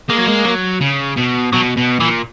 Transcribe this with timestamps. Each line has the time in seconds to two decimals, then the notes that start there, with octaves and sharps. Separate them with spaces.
0.09 G#3 A#3
0.19 F#3
0.28 G#3
0.46 F#3
0.81 C#3
1.17 B2
1.53 B2 F#3
1.77 B2
2.00 A#2 E3